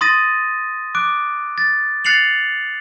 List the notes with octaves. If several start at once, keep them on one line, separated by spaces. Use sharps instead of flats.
C6 D#6 A6 A#6 D#7
D6 F#6 D7
A6
F#6 A6 C7 C#7 F7 F#7